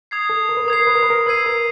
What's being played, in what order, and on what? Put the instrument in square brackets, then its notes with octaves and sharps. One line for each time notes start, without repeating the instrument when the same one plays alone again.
[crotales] D#6 G#6 C7
[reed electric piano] A4
A#4
B4
A#4
[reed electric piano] B4 [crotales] D#6 G#6 C7
[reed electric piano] A#4
B4
A#4
B4
A#4
[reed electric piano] B4 [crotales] E6 G#6 C7 D#7
[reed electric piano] A#4